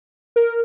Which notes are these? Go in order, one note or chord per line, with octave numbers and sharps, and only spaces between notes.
A#4